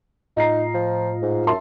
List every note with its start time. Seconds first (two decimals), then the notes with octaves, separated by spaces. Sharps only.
0.37 A2 D#4 F4 D#5 A#5 C7
0.74 F3
1.22 G#2
1.47 F#2 E5 A5 C6